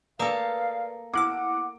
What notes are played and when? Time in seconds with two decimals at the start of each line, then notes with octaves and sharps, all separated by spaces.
0.19 A#3 A4 B4 D5 F5 D#6
1.14 B3 E4 F#5 D6 E6